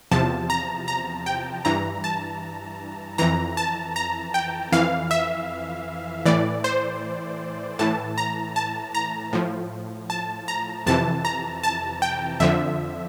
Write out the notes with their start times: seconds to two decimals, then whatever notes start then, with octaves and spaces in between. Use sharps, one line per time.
0.11 E2 C3 F3 A5
0.50 A#5
0.88 A#5
1.26 G5
1.65 G2 E3 A#5
2.04 A5
3.18 F2 E3 A#5
3.57 A5
3.96 A#5
4.34 G5
4.72 F2 E3 F5
5.11 E5
6.26 A2 E3 D5
6.64 C5
7.79 A2 E3 A5
8.18 A#5
8.56 A5
8.95 A#5
9.33 A2 F3
10.10 A5
10.48 A#5
10.86 F2 C3 E3 A5
11.25 A#5
11.63 A5
12.02 G5
12.40 F2 D3 F3 E5